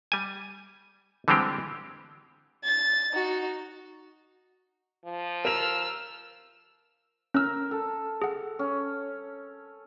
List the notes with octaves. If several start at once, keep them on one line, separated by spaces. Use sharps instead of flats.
G3 G#5
D3 E3 G3 G#3 C4 G4
A6
D#4 F#4
F3
A#4 E6 F6 F7
C#4 A#4 E6
A4
G#4 F#5
C#4